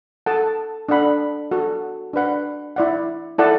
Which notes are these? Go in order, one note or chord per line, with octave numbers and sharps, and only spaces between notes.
A4 F#5 A5
D4 A4 F#5 B5
F#4 A4 F#5
D4 B4 F#5
E4 D5 F#5
E4 A4 D5 F#5 A5